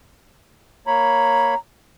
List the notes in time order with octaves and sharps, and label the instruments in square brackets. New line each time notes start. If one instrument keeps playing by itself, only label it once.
[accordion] A#3 C#5 B5 [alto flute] A#5